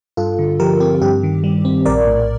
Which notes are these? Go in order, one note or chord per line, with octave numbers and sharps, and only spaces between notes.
G2 F4 A4
D3
F3 G4 A#4
C4 G4
G2 G4
D#3
G3
C4
A#1 A#4 D5
A2